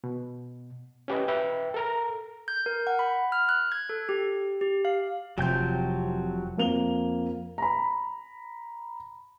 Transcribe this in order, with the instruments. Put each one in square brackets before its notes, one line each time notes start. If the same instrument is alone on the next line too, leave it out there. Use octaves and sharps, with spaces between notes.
[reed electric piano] B2
C#4 G4 B4 D#5
B4 E5 G5
A4 A#4 A#5
[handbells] G6
A#4
F#5
B5
F6
F#6
G#6
A4
G4
G4
F5
[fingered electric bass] F1 [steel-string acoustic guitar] C3 F3 [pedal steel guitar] F#3 G5 G6
[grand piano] F2 A#3 F7 G7
A#5 B5